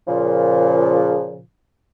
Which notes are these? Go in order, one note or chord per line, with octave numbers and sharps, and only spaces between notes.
A#2 C#3 F3